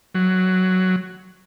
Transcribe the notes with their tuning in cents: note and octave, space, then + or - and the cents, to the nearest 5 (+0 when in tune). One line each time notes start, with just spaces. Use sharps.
F#3 +5